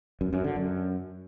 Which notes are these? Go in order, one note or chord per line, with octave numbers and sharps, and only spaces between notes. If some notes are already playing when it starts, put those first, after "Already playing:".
F#2
F#2
D3
F#2